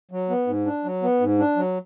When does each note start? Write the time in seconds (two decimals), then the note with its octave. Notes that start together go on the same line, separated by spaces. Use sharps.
0.11 F#3
0.30 B3
0.47 G#2
0.65 D4
0.84 F#3
1.03 B3
1.20 G#2
1.39 D4
1.56 F#3